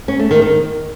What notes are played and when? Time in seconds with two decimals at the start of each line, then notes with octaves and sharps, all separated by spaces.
0.08 C#4
0.19 A3
0.31 D#3
0.42 D#3